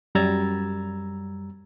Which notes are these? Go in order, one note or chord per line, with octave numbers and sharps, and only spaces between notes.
F#2 G3 A#5 E6 G#6 A6